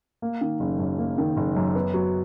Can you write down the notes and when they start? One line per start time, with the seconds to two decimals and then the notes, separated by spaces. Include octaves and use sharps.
0.22 A#3
0.41 D#3
0.60 F#1
0.79 F#2
0.98 A#3
1.18 D#3
1.37 F#1
1.56 F#2
1.75 B3
1.94 F#3